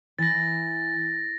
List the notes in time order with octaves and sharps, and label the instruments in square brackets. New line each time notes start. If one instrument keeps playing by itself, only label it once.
[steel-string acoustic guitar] E3 [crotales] A6 A#6